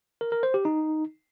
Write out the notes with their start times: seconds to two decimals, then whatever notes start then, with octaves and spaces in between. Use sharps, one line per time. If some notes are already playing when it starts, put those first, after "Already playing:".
0.21 A#4
0.32 A#4
0.43 C5
0.54 G4
0.65 D#4